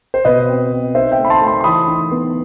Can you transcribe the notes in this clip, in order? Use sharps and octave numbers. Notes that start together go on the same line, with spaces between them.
C5
B2 B4 D#5
C4
C4
D#4 C5 E5
E5 G5
A3
B5
A5 C6
A3
A5 C6
C6
E3 B5 D#6
D#4
B3